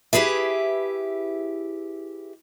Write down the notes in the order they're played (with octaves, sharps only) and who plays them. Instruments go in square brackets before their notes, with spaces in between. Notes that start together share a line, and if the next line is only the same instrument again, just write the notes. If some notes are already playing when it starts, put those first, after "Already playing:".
[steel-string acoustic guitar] E4 G4 G#4 B4 E5